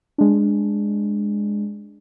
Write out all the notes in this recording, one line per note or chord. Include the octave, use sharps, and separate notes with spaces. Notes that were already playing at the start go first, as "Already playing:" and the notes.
G#3 D4